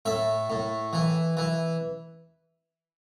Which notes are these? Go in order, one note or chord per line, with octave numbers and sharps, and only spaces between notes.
A2 E5
A2
E3
E3